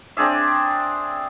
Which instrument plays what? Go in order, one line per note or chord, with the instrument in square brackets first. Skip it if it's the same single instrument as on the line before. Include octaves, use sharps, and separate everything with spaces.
[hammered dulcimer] C4 D4 G#4 E5